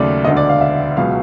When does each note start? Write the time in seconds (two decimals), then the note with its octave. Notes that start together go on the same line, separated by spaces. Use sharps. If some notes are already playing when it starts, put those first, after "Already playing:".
Already playing: D#2 C#3 F#3 A3 D5
0.25 E1 D2 D3 D#5
0.37 D5
0.49 F5
0.61 E5
0.97 C#2 B2 F#3 F5